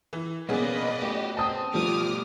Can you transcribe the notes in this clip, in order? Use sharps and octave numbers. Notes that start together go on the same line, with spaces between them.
E3
B1 A#3 B3 C#4 G#4 B4 D5 D#5
A3 F#4 G4
C4 A5 D#6
B2 F3 G3 A3 D6 D#6 F6